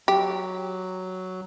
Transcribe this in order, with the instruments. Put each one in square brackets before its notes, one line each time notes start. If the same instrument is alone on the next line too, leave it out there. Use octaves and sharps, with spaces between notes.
[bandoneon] F#3 [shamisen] G4